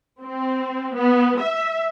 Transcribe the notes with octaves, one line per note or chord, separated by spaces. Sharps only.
C4
B3
E5